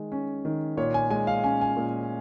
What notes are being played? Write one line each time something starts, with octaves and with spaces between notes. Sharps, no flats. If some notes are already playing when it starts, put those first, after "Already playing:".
Already playing: D#3 G#3
C#4
D#3
A#2 C#5
G#5
G#3 G#5
F5
C#4 G#5
G#5
A#2